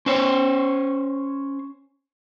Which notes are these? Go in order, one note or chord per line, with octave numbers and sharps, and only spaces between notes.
C#4 C5 C#5